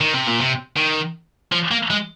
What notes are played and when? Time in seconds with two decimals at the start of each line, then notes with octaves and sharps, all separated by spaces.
0.01 D#3
0.14 C3
0.28 A#2
0.41 C3
0.77 D#3
1.52 F3
1.71 A#3
1.90 G#3